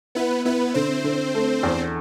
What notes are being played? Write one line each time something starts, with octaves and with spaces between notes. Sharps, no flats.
B3 E4 B4
B3 E4 B4
D3 C4 C5
D3
A3
E2